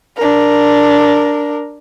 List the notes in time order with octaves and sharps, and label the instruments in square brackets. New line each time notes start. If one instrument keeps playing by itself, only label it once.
[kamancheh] D4 A#4